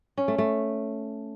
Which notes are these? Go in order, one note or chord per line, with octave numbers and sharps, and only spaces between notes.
C#4
A3
A3